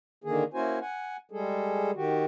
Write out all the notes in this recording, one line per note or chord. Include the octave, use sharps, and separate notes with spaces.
D3 D#3 A#3 G#4
A#3 C#4 E4 F#4 C5 G#5
F#5 G#5
G3 G#3 G#4 A4
D#3 F#4 G4